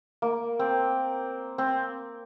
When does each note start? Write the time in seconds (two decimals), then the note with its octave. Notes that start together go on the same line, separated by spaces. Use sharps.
0.22 A#3
0.59 C4
1.58 C4